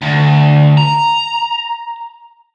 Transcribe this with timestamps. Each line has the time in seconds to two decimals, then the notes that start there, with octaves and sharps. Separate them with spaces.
0.02 D2
0.77 A#5